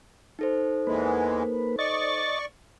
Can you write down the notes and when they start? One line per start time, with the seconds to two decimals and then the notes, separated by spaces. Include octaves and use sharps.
0.39 D#4 A4 C5
0.87 E2 E3 G#3 A#3 B4
1.79 D5 D#5 C#6 A6